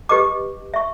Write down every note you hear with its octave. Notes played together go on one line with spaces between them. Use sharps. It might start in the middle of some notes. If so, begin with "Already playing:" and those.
G4 B4 D#5 D6
E5 C#6